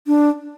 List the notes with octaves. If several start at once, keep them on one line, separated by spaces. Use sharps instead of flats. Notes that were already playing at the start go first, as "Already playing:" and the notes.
D4